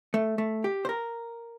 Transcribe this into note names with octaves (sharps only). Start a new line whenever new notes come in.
A3
A3
G4
C5
A#4